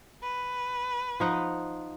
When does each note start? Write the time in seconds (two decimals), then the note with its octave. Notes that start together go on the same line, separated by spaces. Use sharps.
0.23 B4
1.20 F3 D#4 F#5